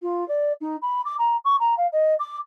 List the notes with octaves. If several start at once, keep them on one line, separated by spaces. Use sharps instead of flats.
F4
D5
D#4
B5
D6
A#5
C#6
A#5
F5
D#5
D6